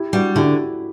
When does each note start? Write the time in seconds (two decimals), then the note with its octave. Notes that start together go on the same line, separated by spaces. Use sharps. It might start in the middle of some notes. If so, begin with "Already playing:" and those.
Already playing: E4 G4
0.13 G3 D4 F#4
0.35 D3 E4 G4